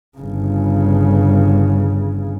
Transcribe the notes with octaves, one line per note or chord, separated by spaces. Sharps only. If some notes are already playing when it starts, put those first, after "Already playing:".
G1 C#3